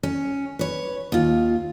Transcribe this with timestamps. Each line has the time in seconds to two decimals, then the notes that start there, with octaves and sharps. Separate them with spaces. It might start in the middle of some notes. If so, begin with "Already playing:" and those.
0.03 C#4
0.59 B4 C#5
1.12 D#2 F4